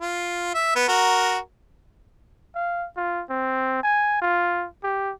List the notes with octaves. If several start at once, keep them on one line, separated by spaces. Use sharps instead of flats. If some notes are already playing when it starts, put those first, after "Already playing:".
F4
E5
B3
F#4 A#4
F5
F4
C4
G#5
F4
G4